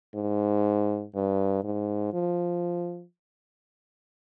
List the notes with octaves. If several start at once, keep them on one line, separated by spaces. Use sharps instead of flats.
G#2
G2
G#2
F3